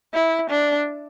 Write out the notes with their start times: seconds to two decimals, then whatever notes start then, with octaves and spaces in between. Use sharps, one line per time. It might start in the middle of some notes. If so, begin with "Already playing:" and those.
0.14 E4
0.51 D4